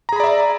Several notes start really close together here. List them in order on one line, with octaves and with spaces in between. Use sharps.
A#5 G#4 B5 D5 E5